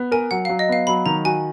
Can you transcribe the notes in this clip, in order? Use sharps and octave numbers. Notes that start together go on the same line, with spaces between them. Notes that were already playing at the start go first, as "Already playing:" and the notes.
Already playing: B3
A#4 G#5
F#3 F#5
F#3 F5
D#5
B3 F5
F#3 B5
D#3 A#5
F#4 G#5